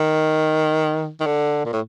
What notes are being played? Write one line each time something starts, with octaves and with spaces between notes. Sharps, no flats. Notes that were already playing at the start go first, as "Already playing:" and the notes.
Already playing: D#3
D#3
D3
A#2
A2